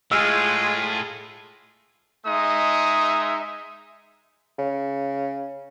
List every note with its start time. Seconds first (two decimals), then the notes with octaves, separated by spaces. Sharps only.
0.12 A2 G#3 F4 G#4 E6 F6
2.26 G#3 D#4 E5 D#6
4.58 C#3